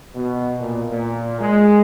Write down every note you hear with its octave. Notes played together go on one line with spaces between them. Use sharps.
B2
A#2
A#2
G#3